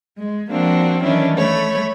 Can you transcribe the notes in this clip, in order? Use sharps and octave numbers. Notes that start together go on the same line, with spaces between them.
G#3
F3 A#3 C4 D4 F#4
D#3 E3 F#3 C#4 D4 E4
A3 C#5 B5